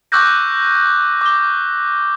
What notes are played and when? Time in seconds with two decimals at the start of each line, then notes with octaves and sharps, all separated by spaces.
0.12 C#6 D6 E6 F#6 G6 A#6
1.21 D6 G7